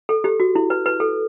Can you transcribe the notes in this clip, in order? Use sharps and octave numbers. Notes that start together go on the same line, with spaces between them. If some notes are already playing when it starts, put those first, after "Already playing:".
A4
G4
F#4
E4
B4
B4
A4